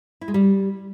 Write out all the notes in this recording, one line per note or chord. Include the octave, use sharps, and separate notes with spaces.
E4
G#3
G3